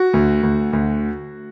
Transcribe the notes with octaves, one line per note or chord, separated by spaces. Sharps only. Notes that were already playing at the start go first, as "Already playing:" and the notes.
Already playing: F#4
D2
D2
D2